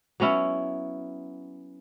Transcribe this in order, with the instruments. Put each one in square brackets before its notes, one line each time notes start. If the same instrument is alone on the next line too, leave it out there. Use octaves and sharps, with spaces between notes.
[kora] F#3 B3 C#4 E4